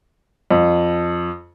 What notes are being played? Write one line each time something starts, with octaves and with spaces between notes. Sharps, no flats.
F2